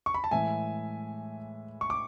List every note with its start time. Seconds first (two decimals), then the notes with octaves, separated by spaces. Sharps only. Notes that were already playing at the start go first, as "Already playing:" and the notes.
0.06 C#6
0.14 B5
0.24 A5
0.31 A2 E3 G#3 E5 G#5
1.81 C#6
1.90 D6